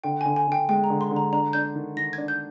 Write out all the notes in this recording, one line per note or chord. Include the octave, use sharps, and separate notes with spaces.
D3 G5
D3 G#5
G#5
D3 G5
G#3 G5
A#5
D3
C6
D3
A#5
D4 A#5
D4 G6
D#3
D#3 A#6
D4 G#6
G6